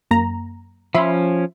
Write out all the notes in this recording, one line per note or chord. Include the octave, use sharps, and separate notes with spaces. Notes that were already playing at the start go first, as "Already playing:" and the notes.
F#2 A#3 A#5
F3 C#4 E5 B5 C6